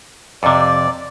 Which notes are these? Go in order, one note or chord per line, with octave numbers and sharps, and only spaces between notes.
F2 C3 D5